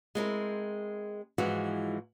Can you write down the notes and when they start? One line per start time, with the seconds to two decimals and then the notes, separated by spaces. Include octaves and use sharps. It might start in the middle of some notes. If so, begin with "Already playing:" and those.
0.15 G#3 C4 E4 A#4
1.38 G#2 E3 F3 G#3 F#4